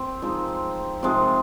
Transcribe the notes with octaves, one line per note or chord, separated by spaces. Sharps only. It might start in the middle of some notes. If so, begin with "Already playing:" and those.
Already playing: C4
F3 G#3 D#4
C3 F3 G#3 D#4 F5